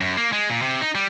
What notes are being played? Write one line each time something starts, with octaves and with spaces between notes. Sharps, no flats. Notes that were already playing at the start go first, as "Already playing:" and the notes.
F#2
A#3
G#3
A#2
C3
D#4
G3